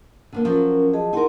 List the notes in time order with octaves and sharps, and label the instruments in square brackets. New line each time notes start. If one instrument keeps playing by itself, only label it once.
[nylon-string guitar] D3 G3 A#3
[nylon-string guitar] F3 F#3 [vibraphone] C#4 A#4
[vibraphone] G#4 D#5 A5
[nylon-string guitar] D#4 A#4 [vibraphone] E4 F#5 C6